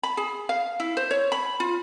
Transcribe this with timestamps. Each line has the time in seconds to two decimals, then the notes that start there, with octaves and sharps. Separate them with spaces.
0.03 B5
0.17 G#4
0.49 F5
0.80 E4
0.97 C5
1.11 C#5
1.32 B5
1.60 F4